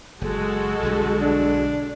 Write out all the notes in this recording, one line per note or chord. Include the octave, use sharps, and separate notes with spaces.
F#1 G#3 F#4 A4
B1 D3 G3
D4